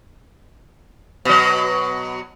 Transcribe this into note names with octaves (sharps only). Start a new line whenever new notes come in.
B2 F#3